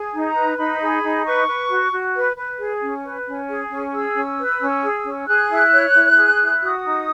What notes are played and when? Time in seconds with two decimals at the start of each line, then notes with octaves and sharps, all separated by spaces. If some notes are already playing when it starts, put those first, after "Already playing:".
Already playing: G#4
0.13 D#4
0.25 A#5
0.35 B4
0.57 D#4 B5
0.81 G#4
1.03 D#4
1.25 B4 C#6
1.48 B4
1.69 F#4
1.92 F#4
2.15 B4
2.36 B4
2.59 G#4
2.81 C#4
3.04 B4
3.27 C#4
3.48 G#4
3.71 C#4
3.93 G#4 E6
4.15 C#4
4.38 B4
4.60 C#4
4.83 G#4
5.05 C#4
5.27 G#4 F#6
5.51 E4
5.73 C#5
5.94 E4
6.17 G#4
6.40 E4
6.61 F#4 D#6
6.84 D#4